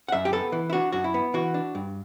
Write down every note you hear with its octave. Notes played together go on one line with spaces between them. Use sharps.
F#5
F#2 E5
G4
B3 A4
E3
E4
D4 F#4
F#2 F#4
E4
B3
E3 F#4
D4
G2